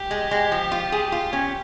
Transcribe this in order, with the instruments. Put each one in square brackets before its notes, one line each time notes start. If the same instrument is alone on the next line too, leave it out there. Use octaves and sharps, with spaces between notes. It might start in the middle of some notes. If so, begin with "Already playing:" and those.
Already playing: [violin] G4
[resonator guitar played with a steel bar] G#3
G#3
F3
F4
G#4
F4
C#4